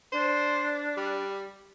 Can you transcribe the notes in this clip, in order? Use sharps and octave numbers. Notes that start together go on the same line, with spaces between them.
D4 C5
G3